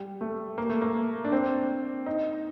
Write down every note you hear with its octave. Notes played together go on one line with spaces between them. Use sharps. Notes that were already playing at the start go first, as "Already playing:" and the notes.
Already playing: G3
A3
A#3
A3
A#3
D4
C4
D#4